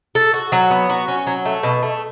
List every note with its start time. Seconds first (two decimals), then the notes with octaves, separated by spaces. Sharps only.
0.15 A4
0.34 F#4
0.52 F#3
0.71 B3
0.90 F#4
1.08 C#4
1.27 F#3
1.45 A3
1.63 B2
1.82 A3